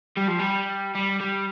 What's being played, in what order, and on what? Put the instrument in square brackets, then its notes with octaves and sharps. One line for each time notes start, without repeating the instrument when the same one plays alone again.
[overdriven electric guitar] G3
F3
G3
G3
G3